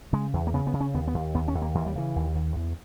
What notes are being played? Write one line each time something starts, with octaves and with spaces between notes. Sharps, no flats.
C#3 G#3
E2
A#3
C#3 B3
B3
C#3
C#4
D#2 B3
B3
D#2
D#2 B3
C#4
D#2
A#3
D#2 E3
G3
C#3 E3
D#2
D#2
E2